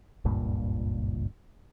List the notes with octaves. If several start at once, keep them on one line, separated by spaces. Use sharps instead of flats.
F#1 C#2 G2 A#2